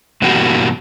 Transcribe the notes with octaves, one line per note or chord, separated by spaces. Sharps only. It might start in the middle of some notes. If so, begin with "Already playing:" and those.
G2 B2 E3 A#3 F#4 G4